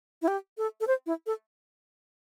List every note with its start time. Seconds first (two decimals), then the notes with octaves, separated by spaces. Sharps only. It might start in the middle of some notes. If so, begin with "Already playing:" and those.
0.22 E4
0.28 G4
0.58 A4
0.80 A4
0.87 C5
1.06 E4
1.26 A4